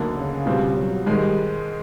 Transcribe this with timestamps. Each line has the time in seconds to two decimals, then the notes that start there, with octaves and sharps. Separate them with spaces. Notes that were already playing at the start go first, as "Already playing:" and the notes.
Already playing: D2 D3 F#3 A#3 D#4
0.15 C#3
0.46 B2 G3 C4 F4
0.76 F#3
1.06 G#2 D#3 G3 G#3